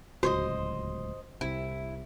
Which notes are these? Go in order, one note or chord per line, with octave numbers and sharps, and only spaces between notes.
D1 C#2 F#4 C5 C#5 D#5
C2 C3 E4